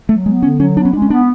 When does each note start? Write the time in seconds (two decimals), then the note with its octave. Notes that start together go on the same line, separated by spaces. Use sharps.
0.09 F#3 A3
0.26 G#3 B3
0.42 D3 C#4
0.60 F#3 C#4
0.77 B3 D4
0.85 C#4
0.93 G#3 D4
1.02 C#4
1.10 B3 D4